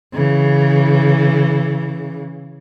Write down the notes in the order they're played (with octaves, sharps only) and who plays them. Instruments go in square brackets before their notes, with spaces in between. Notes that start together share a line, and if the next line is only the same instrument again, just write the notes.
[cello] C#3 E3